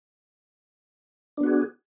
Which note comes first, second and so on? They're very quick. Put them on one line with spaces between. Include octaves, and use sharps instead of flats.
D4 B3 F#4 G#4